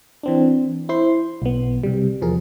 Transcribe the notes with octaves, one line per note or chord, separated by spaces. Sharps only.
E3 C4 D4
E4 C5 C6
B1 B3
C3 G3
E2 F3 G#4 A#4